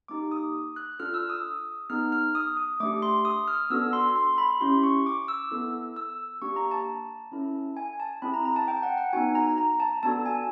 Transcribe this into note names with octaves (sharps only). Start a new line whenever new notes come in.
A#3 D#4 G4 D6
D#6
F#6
D4 F4 A4 F6
E6
D#6
B3 D#4 G#4 F6
F6
D#6
D#6
A3 D4 G4 D6
C6
D#6
F6
B3 D4 F#4 A4 E6
C6
C6
B5
C#4 E4 G4 C6
C#6
D6
E6
B3 E4 A4
E6
A#3 D4 G4 C#6
A#5
A5
C#4 E4 A4
G#5
A5
C4 E4 G#4 B5
A#5
A#5
A5
G5
F#5
F#5
B3 D#4 F#4 G#5
A#5
A#5
A5
B3 D4 F#4 A4 A5
G#5